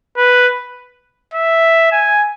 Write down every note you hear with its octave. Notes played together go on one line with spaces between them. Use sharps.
B4
E5
G#5